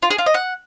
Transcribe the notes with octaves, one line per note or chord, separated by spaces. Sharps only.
F4
G#4
F4
D#5
F#5